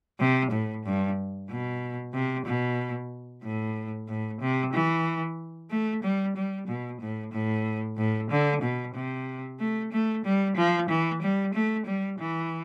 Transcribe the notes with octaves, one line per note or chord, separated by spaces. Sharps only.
C3
A2
G2
B2
C3
B2
A2
A2
C3
E3
A3
G3
G3
B2
A2
A2
A2
D3
B2
C3
A3
A3
G3
F3
E3
G3
A3
G3
E3